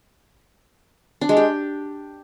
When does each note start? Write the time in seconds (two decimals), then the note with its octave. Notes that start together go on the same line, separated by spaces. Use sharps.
1.21 D4
1.29 G#3
1.37 G4